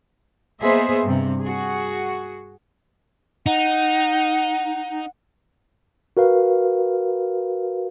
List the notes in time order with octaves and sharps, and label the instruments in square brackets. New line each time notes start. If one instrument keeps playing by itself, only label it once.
[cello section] A#3 B3 G#4 C5 D#5 E5
G2 C3
F#4 G#4
[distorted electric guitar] D#4 [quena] F#5
[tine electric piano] F#4 A#4 B4 F5